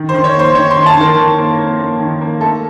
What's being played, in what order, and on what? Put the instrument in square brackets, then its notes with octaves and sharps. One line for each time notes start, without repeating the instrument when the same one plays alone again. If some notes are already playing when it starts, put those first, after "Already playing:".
Already playing: [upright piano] D#3
C5
D#3
C#5
A#3
C5
D#3 C#5
C6
D#3
A5
D#3 A#4
D#3
A#3
A#3
A#3
D#3
A#3
A3 A4